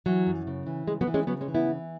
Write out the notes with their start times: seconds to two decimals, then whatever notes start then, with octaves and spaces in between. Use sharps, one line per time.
0.06 E3 F#3
0.26 F#2
0.47 C#3
0.66 E3
0.87 C#3 G#3
1.01 F#3 B3
1.07 E3
1.14 G#3 C#4
1.27 C#3 F#3 B3
1.41 G#3 C#4
1.48 E3
1.54 B3 E4
1.68 E3